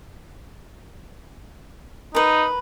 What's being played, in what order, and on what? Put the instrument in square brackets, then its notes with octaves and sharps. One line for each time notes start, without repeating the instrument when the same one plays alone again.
[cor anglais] D#4 [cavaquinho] A#4 B4